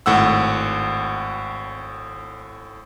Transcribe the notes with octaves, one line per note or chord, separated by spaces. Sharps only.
G#1 A2 F#5 E6